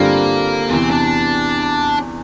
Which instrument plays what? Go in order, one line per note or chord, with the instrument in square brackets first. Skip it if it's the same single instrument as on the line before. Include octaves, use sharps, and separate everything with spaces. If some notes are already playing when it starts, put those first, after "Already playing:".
Already playing: [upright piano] G2 D3 G3 C4 F4 [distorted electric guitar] A#3
[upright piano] E2 C3 E3 [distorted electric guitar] C4
[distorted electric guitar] D4